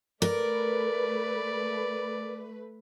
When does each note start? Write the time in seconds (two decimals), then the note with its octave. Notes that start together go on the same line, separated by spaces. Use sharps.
0.22 A3 A#4 B4 D5